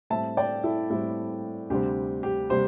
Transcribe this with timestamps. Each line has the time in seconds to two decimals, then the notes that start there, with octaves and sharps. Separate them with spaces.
0.10 A2 G3 C4 E5 A5
0.37 D5 G5
0.64 E4 A4
0.90 A2 G3 C4 E4
1.70 D2 C3 G3 C4 G4
2.23 G4
2.50 C3 G3 G4 C5